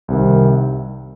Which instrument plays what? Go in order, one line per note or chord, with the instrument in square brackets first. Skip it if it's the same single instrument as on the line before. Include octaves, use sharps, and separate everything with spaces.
[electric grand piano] C2 C3 D#3